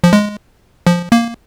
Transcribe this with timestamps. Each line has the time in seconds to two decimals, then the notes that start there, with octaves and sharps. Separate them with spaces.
0.04 F3
0.13 G#3
0.87 F3
1.12 A#3